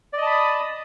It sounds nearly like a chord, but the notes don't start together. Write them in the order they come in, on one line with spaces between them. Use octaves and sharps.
D5 D#5 A5 B5 D#6